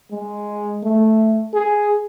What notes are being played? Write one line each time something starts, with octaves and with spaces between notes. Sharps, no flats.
G#3
A3
G#4